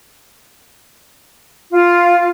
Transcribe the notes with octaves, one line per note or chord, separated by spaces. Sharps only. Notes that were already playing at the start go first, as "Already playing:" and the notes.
F4